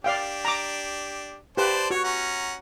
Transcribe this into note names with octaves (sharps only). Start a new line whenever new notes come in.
D4 G4 D5 F5 G5
A#5 D6
G4 B4 C5 D5 A5
F#4 C#5
C#4 F#5 A#5